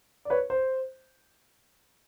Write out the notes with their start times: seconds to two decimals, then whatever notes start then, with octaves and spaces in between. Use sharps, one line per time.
0.25 D5
0.30 B4 C#5
0.50 C5